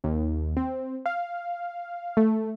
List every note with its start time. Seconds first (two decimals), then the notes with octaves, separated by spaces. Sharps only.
0.04 D#2
0.57 C4
1.06 F5
2.17 A3